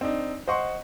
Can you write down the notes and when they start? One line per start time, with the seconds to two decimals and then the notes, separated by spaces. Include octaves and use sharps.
0.01 C4 D4 D#4
0.48 C5 D#5 F#5 C6 C#6